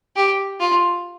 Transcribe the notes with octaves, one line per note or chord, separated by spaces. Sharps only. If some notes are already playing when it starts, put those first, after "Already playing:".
G4
F4